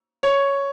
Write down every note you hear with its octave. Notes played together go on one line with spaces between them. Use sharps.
C#5